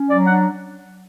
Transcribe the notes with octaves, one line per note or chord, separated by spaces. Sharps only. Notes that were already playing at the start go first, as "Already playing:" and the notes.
Already playing: C#4
F#3 D5
D4 F#5